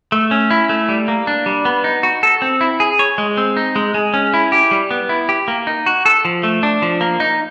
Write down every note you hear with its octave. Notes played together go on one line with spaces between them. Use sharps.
A3
C#4
E4
A3
G3
A#3
D4
G3
B3
D#4
F#4
A4
C4
E4
G#4
C#5
G#3
C4
D#4
G#3
G#3
C#4
E4
G4
G3
B3
E4
G4
A#3
D#4
F#4
A4
F3
A3
D4
F3
A#3
D#4